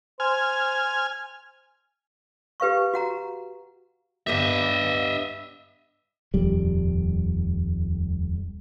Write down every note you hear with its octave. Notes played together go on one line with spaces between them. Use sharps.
C5 G#5 F6
G4 B4 F5 C#6
F#4 F#5 A#5
G2 B3 G4 D#5 E5
D#1 F2 G3